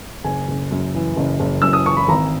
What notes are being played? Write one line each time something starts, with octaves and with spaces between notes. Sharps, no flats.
F#1 G#5
F#1
F#2
E3
F#1
F#1
F#2 E6
D#6
E3 C#6
B5
G#1 A#5